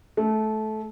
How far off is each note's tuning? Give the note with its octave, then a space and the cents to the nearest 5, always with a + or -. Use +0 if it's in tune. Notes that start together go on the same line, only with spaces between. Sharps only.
A3 -20